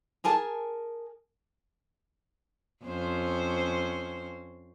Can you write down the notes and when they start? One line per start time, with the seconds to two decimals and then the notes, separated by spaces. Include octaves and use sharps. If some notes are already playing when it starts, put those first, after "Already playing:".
0.24 G#4 A#4 G#5 A5
2.85 F2 C#4 C5